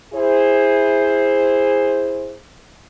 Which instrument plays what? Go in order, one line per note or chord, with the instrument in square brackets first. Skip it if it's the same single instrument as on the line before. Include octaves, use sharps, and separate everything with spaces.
[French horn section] E4 G#4 C5